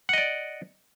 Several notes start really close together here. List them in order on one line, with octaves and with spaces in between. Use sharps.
F#5 D#5 D5